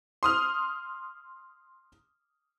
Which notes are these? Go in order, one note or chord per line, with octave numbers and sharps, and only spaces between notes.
C6 D#6 F6